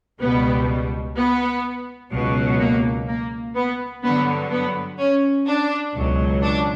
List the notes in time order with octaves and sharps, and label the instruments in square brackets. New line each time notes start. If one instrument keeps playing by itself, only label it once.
[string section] C#2 B2 G3 B3
B3
C#2 B2 F#3
A#3
A#3
B3
G2 D3 F#3 B3
B3
C#4
D4
C#2 B2 F#3
D4